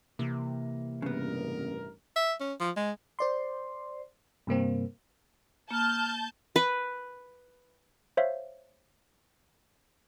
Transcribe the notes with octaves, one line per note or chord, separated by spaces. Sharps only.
C2 C3 E3 A#3
A1 G2 C#3 B3 A#4
E5
C#4
F3
G#3
C5 D5 C6
G2 C3 A#3 C4
A#3 A5 F6 G6
B4
C5 C#5 E5 F5